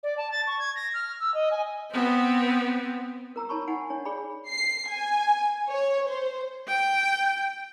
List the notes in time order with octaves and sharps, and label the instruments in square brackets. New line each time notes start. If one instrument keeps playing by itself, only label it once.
[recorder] D5
A5
A6
C#6
G#6
A#6
F6
E6
D#5
G#5
[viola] B3 C4
[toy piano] A#4 A#5 E6
D#4 C#5 A5 B5 C#6
D#4 F#5 G#5
D4 C#5
G#4 C#5 D5 B5
[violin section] C7
G#5
C#5
C5
[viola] G5